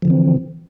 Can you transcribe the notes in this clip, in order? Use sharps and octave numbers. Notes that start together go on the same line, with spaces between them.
D3 E3 F3 C4